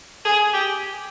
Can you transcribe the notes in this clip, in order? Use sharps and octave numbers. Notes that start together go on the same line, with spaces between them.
G#4
G4